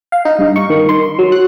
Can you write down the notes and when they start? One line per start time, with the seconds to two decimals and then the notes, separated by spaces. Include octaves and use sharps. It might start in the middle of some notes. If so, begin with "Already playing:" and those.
0.12 F5
0.25 D#4
0.39 G2
0.56 C#6
0.70 D#3
0.89 C6
1.03 C6
1.19 F#3
1.32 F#6